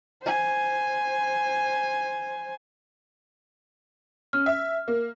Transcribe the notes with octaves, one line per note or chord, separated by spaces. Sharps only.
C5 G#5
C#4 F6
E5
A#3